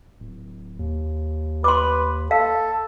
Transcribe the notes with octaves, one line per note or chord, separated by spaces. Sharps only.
D1
D#2
B4 C6 D6
A4 F5